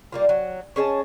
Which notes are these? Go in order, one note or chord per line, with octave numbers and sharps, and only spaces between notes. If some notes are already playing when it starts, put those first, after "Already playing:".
G3 A#3 F4
F#3
C#4 G#4 D#5 A5